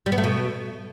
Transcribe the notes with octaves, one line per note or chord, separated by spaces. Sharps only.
G3
B3
A3
B2